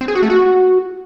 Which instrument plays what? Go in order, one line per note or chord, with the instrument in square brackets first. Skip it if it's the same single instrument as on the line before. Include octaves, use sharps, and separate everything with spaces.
[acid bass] C4
G#4
F#4
A3
F#4